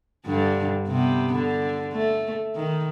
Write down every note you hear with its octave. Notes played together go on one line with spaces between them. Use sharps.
G2 D3
C3 B3
D3
A3
D#3